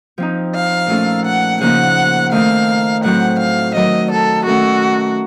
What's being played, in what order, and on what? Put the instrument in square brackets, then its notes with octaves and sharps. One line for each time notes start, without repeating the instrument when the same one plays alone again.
[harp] F3 C4 D#4
[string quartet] F5
[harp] A#2 A3 C#4 F4 A4
[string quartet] F#5
[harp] C#3 F3 A#3 D#4 [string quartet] F#5
[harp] D#3 A3 C4 D#4 [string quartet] F5
[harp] A2 F#3 C4 [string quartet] F#5
[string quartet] F5
[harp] D#3 F#3 A3 [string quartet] D#5
[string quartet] A4
[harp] D#3 A3 C#4 A4 [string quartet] F#4